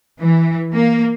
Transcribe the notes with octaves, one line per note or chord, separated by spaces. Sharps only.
E3
A#3